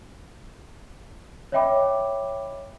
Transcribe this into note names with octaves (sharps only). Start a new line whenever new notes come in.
C#5 D#5 E5 G5 B5 D6